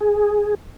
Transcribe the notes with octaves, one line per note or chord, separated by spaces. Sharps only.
G#4